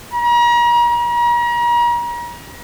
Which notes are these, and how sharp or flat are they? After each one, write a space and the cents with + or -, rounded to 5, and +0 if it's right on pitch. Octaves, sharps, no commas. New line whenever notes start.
A#5 +40
A#5 +40